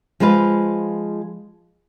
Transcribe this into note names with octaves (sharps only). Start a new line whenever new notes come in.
F3 G#3 F4 B4 F5